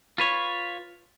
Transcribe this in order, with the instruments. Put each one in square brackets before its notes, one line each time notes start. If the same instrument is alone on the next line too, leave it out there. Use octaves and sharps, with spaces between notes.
[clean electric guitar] F4 B4 C#5